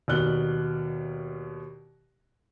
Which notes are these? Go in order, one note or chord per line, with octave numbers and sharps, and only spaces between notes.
D#2 B2 D5 F6 F#6 G7